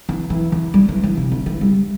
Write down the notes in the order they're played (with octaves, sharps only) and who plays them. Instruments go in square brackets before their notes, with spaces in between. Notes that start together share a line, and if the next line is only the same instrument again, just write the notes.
[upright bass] E3
E3
E3
G3
E3
E3
C3
D3
E3
G3